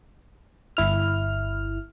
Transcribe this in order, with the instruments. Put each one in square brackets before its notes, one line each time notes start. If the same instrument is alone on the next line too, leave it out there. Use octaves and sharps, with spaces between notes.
[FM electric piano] G1 E4 F6